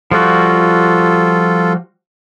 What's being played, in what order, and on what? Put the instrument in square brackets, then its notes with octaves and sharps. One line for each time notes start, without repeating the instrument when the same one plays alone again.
[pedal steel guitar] F3 G3 F#4 [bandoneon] F4 A4